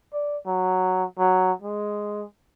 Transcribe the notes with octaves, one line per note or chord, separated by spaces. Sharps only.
D5
F#3
F#3
G#3